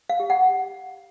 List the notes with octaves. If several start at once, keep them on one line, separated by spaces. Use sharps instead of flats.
F5
G4
F#5